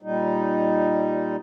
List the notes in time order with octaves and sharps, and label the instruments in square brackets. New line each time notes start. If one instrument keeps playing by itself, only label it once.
[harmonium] A#2 G3 D#4